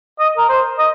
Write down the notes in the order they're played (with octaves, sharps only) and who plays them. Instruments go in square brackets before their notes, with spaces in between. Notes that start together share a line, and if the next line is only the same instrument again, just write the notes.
[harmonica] D#5
A#4
C5
D#5